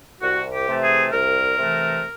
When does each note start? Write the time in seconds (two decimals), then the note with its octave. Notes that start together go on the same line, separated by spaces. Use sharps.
0.21 C2 F#4
0.53 G4
0.68 C3 E3 A3
0.83 G#4
1.12 C2 A#4
1.57 C3 E3 A3